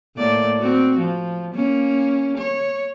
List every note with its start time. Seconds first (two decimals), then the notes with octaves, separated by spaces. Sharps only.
0.16 A2 A#3 D5
0.59 C4 F#4
0.99 F3
1.54 A#3 C#4
2.37 C#5